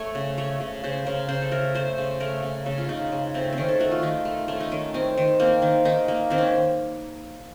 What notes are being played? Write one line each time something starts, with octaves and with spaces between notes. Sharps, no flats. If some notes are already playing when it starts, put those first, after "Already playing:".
Already playing: A3 C#5
C#3
A3 C#5
C#3
C#3 C5
C#3 A#4
C#3 C5
A4
A3 A#4
A3 C5
C#3
A3 A#4
C#3
C#3 A4
F4
C#3 D#4
C#3
A3 C4
C4
D#3 C#4
A4
A3 F#4
F4
D#3 D#4
A3
A3 C#4
D#4
D#3 C#4
D#3 C4
D#3
A#3 C4
D#3
D#3 D#4
A#3
D#3 C4
C#4